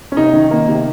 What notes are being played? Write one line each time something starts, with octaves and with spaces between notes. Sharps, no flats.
C#4
C3 D#4
D#3
A#3
C3